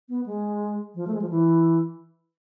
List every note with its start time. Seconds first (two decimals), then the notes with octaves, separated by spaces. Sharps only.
0.09 B3
0.26 G#3
0.95 F3
1.07 A3
1.14 G#3
1.21 F3
1.30 E3